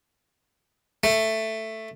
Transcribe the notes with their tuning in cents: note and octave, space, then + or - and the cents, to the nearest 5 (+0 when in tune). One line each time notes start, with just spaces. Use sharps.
A3 +5